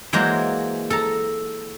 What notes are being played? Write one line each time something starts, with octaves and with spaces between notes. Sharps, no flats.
E3 F#3 G#3 A#3 C5 A#5
A4 A#5